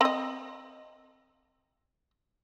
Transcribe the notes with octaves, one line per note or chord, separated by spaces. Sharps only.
C4 D#5